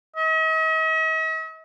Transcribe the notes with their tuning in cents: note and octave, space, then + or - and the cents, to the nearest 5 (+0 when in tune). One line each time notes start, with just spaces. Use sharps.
D#5 +45